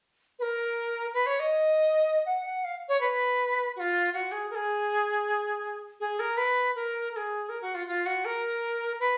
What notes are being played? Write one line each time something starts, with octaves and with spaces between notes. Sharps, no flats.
B4
A#4
B4
C#5
D#5
F#5
F#5
F5
C#5
B4
F#4
F4
F#4
G#4
A#4
G#4
G#4
A#4
B4
A#4
A#4
G#4
A#4
F#4
F4
F4
F#4
A#4
B4